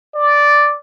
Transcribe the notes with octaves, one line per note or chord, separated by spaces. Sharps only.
D5